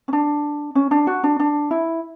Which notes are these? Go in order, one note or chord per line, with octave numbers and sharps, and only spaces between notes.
C#4
D4
C#4
D4
F#4
D4
D4
E4